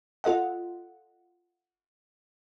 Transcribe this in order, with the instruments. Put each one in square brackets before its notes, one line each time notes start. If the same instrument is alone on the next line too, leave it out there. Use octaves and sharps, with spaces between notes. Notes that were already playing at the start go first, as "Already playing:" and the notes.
[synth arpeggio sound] F4 A4 D#5 F#5